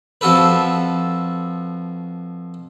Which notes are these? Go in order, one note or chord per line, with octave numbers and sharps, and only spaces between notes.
F2 F3 F#4 A4 B4